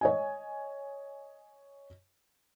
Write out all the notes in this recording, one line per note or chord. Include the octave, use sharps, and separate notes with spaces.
C#5 D#5 G#5